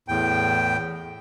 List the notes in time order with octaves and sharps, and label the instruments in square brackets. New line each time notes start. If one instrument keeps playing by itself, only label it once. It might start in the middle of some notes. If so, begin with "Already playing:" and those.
[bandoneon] E2 A2 G5